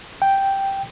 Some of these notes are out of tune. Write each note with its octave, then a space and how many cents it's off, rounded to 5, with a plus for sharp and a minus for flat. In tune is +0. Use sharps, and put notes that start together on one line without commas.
G5 +0